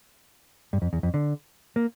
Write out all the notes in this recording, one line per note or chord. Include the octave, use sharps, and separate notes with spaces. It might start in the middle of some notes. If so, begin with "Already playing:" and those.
G2
F2
E2
F2
D3
A#3